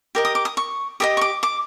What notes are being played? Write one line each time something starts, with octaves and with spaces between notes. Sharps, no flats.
G4 A#4 D#5
D#6
D6
D#6
C#6
G4 A#4 D#5 D#6
C#6
D6
D6